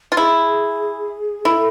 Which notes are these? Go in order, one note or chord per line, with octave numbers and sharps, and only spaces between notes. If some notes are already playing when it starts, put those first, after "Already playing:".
F4
E4 G#4
E4 A4